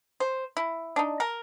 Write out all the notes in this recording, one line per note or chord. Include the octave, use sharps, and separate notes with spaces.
C5
E4
D4 D#4
A#4